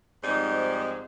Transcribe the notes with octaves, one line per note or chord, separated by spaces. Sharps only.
G#2 F3 G3 C4 D#4